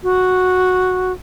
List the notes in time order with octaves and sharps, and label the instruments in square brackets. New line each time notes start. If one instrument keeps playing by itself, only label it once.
[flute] F#4